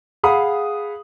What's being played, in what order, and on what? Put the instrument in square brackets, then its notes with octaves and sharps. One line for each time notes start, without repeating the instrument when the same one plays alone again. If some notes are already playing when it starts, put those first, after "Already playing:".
[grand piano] G#4 F5 F#5 B5 D#6